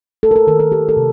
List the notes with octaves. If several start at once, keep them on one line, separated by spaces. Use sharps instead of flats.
A3 A4
A#4
A4
D#3 A#4
A4
D#3 G4
A4
C3